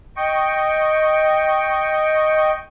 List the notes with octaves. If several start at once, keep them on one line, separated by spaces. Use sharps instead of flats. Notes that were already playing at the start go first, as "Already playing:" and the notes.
D#5 G5 C#6